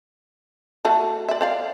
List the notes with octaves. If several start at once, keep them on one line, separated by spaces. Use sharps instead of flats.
A3 F#4 A4
D5 E5
C5 D5 F5